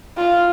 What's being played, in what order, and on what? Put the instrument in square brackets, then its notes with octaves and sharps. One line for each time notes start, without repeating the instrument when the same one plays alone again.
[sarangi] F4